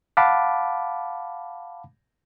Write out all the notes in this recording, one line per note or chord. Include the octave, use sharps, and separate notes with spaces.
F5 F#5 A5 B5 D6